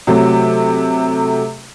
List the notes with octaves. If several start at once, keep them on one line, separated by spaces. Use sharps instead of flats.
C3 F#3 A3